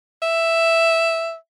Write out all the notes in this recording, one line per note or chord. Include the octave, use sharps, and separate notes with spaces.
E5